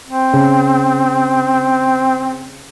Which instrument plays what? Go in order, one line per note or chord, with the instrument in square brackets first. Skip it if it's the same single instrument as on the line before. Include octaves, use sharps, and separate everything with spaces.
[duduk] C4
[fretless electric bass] C#3